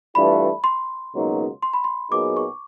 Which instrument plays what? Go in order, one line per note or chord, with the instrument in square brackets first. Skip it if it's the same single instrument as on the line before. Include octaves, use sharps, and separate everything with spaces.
[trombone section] G2 E3 A3 D4 F4 [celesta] B5
[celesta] C6
[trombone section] C#2 B2 F#3 A#3 D#4
[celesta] C6
B5
C6
[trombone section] A#2 F#3 B3 D#4 G#4 [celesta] D6
[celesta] C#6